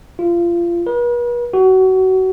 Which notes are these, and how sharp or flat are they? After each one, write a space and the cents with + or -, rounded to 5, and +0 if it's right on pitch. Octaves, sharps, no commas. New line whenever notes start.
F4 -25
B4 -45
F#4 +25